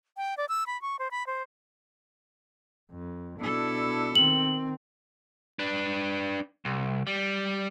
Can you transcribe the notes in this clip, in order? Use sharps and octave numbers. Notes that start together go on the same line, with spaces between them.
G5
D5
E6
B5
C#6
C5
B5
C5
F2
B2 D4 E4 A4
D#3 C4 F#7
D4 B4
C2
G3